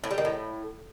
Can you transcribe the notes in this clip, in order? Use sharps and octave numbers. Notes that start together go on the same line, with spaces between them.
A2
G3
D#3
A2